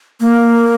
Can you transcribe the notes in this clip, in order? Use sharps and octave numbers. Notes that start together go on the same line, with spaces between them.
A#3